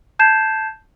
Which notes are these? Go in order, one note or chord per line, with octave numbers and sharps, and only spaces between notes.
A5 G6 G#6 C7 E7